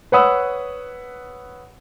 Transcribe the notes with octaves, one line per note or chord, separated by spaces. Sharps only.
B4 C#5 F#5 B5 D#6 E6